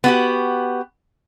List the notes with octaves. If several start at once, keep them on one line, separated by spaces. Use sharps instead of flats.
B3 F#4 G4